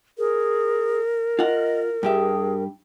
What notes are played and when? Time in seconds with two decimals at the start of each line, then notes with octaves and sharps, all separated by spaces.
0.18 G#4 A#4
1.39 F4 D#5 F#5
2.03 G2 G4 G#4 E5